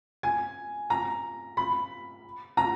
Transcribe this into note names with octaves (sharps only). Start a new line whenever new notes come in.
G#5
A#5
B5
A#5